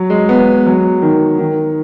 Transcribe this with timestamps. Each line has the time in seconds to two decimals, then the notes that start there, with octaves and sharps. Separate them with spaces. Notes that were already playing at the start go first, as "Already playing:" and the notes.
Already playing: F#3
0.10 G#3
0.29 B3
0.66 F#3
1.02 D#3
1.39 D#3